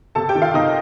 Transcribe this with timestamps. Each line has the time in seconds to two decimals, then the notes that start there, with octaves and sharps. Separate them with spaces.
0.15 C3 A4 A5
0.29 G4 G5
0.35 D#3
0.42 F4 F5
0.54 C3 D#4 D#5